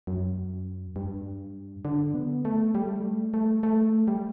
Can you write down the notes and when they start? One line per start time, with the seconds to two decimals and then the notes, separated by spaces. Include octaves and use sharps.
0.07 F#2
0.96 G2
1.85 D3
2.14 B3
2.45 A3
2.75 G3
2.83 A3
2.93 G3
3.03 A3
3.34 A3
3.63 A3
4.08 G3